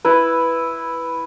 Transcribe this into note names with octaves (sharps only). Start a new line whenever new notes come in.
E4 B4